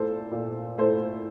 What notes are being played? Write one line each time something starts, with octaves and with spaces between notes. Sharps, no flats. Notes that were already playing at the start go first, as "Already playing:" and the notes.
Already playing: A#2 A3 E4 A4 C5
A#2
A3 E4 A4 C5